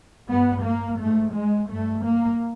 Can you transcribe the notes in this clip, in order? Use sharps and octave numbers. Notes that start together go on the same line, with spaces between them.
G2 B3
A#3
G#2 A3
G#3
G2 A3
A#3